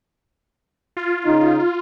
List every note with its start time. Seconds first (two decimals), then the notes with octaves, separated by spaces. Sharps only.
0.97 F4
1.25 C#3 D#4